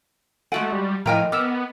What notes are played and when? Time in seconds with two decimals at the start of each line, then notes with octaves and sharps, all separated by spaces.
0.52 G#3 A3 F#4 F#5 G#5 D7
0.72 G3
1.06 A2 F3 A#4 D#5 G5 G#5 A#5
1.32 B3 A#4 D6 E6 E7